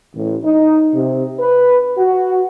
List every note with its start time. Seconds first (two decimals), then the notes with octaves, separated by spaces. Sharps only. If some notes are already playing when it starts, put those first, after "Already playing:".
0.14 A1
0.44 D#4
0.93 C3
1.39 B4
1.97 F#4